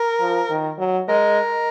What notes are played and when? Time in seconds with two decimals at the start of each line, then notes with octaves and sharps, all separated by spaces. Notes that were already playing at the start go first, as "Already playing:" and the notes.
Already playing: A#4
0.20 F3
0.50 D#3
0.79 F#3
1.08 G#3 A#4